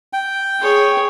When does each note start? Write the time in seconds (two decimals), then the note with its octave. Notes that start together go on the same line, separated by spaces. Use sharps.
0.13 G5
0.59 G#4 C#5